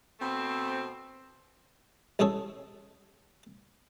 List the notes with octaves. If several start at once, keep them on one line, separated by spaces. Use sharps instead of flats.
B2 A3 C4
A1 G#3 C#4 G#4 A4 C#5